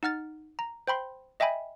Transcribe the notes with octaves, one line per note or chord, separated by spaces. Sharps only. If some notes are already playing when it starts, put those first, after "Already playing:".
D#4 F#5 F6 A6
A#5
C5 G5 B5 C6
D#5 E5 G5 G#5 B5